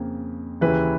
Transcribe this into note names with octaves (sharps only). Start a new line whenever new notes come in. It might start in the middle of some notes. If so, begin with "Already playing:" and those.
Already playing: F2 C#3 A#3
D#2 C#3 E3 B4